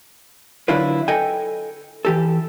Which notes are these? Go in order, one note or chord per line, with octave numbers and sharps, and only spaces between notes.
D3 F#3 D4 E4 F4 B4
A4 D#5 G5 G#5
E3 G4 A4